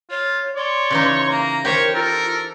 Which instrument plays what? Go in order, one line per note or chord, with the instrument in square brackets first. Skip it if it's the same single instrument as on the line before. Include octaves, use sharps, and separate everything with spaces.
[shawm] F4 [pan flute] C#5
[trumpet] C#5 [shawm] D5 [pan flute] C6
[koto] C#3 E3 D#4
[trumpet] A#3 [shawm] A#5
[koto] G4 C5 [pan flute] A#4 [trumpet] C#5
[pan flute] F4 [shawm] A4 [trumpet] A#4